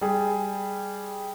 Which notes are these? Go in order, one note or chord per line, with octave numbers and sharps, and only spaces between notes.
G3 G#4